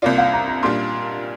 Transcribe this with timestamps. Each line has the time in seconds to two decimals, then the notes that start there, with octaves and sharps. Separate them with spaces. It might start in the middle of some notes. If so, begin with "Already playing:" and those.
0.02 C2 C3 A#3 F4 D5
0.18 F5
0.33 A#5
0.48 A#5
0.63 A#2 G3 D4 F4 C6